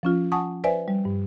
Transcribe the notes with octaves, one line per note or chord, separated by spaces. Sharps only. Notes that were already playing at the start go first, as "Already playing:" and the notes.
F3 C#4 F4
F#5 G#5 A5 C#6 D#6
B4 C5 D5 E5 G#5
G3
G2